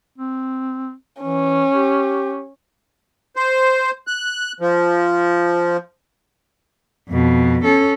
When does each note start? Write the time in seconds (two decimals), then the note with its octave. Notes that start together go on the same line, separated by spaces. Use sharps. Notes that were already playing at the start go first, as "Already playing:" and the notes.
0.18 C4
1.22 E3 C#4
1.72 G4
3.36 C5
4.07 F#6
4.60 F3
7.09 F2 B2
7.64 C#4 A4